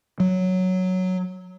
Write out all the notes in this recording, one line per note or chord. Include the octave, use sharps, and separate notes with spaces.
F#3